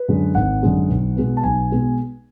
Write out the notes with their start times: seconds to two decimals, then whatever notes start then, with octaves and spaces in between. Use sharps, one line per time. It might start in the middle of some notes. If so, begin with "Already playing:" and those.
Already playing: B4
0.08 F#2 D3 G#3
0.35 G#1 F#5
0.63 F#2 D3 G#3
0.89 B1
1.16 B2 G#3 B3
1.37 A5
1.43 B1 G#5
1.71 B2 G#3 B3